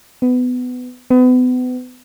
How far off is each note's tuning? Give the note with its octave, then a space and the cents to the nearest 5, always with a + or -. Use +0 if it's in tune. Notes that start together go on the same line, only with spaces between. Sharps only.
B3 +20
B3 +35